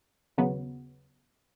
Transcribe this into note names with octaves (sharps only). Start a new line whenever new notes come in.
D#2 C#3 F#3 B3